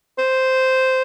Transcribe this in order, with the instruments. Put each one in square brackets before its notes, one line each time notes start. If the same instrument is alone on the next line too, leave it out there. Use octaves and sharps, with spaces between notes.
[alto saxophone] C5